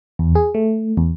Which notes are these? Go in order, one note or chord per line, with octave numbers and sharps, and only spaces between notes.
E2
G#4
A3
E2